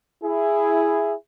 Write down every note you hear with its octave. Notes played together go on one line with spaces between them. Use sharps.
E4 G#4